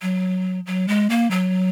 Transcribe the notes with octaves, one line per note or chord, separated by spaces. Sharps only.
F#3
F#3
G#3
A#3
F#3